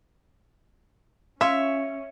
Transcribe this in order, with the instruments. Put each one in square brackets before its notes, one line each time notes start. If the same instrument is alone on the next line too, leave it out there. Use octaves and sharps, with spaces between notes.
[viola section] C#4 [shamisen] F4 [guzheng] C#5 E5